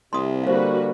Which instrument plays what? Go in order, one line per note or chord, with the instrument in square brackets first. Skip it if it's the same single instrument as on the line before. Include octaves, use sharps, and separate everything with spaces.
[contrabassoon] C2 [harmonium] C3 [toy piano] C6 D#6
[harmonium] D3 G3 A#3 [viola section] F#4 B4 [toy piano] C5 F5